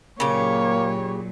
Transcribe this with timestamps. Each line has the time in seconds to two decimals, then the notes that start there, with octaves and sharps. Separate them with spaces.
0.20 A#2 C#3 F#3 A#3 G4 C#5